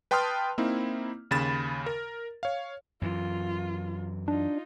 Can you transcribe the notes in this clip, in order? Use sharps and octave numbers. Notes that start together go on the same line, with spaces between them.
B4 G5 A5 C6 D#6 F6
A#3 C4 D#4 E4
D#2 C#3 B5 A6 E7
A#4
C#5 F5
F#2 E3 F4
D4 D#4 F4